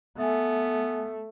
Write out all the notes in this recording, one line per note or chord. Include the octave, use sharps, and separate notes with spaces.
A3 B3 E5 G#5